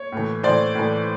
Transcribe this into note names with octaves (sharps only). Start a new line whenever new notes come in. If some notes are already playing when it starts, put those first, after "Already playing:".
Already playing: C#5
A2 E3
A2 E3 C5 D5
A2 E3